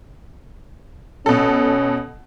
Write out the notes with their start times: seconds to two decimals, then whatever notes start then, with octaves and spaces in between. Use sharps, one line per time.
1.26 B2 C#4 A4